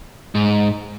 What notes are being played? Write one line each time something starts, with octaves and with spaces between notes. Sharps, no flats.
G#2